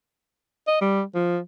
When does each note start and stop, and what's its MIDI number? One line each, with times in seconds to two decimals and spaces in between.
0.67 0.80 75
0.81 1.03 55
1.15 1.39 53